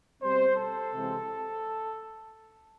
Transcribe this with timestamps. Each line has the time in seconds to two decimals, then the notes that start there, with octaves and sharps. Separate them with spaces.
0.22 B2 G3 C4 C5
0.56 A4
0.93 C3 E3 G#3 C4